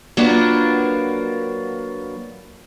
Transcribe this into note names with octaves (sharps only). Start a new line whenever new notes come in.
F#3 A#3 D4 F4 A#4 B4